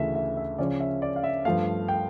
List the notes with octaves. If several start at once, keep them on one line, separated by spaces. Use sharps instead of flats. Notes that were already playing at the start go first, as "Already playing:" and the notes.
Already playing: D2 C#3 E3 A3 E5
E5
E5
C#3 F3 C#4 D5
E5
D5
F5
E5
G2 F3 A3 F5
G5